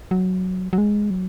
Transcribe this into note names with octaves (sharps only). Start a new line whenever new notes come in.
F#3
F#3
G#3
F#3